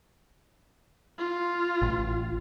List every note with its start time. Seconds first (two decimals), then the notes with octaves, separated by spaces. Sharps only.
1.18 F4
1.82 A1